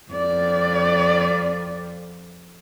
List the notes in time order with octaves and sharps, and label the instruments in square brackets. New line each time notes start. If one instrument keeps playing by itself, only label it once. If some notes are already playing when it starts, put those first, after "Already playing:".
[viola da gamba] F2 [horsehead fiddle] D5